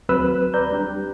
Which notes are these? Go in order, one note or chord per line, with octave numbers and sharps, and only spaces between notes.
D#2 F#3 C4 B4 E6 F#6
B4 D5 A#5 G6
G3 D4 G4